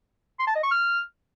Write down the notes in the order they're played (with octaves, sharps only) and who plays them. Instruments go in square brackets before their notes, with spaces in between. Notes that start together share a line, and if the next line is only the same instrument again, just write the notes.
[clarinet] C6
A5
D#5
C#6
F6